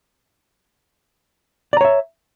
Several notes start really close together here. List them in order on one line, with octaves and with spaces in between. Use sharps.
D5 A#5 C#5 E5